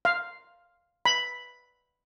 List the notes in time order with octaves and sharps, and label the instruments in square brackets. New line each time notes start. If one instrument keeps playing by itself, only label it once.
[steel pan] F5
B5